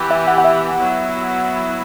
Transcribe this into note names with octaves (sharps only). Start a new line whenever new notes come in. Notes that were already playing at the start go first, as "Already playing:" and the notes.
Already playing: E3 B3 E4 G4
E5
F#5
F#5
E5
F#3 B3 E4